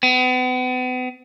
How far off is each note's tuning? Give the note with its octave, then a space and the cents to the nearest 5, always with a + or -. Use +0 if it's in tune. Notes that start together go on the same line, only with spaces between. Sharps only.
B3 +40